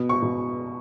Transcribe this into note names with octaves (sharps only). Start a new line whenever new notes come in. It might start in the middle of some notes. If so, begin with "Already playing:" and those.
Already playing: B2
C#6
B2